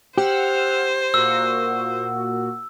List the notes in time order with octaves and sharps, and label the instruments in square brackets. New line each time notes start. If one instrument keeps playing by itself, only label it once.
[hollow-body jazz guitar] G4 [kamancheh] C5 [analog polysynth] F#5 E6 F6
[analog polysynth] A#2 A#3 F#4 [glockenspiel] E6